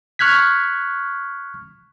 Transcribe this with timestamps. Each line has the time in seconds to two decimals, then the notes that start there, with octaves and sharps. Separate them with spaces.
0.19 C#6 F6 F#6 G#6 B6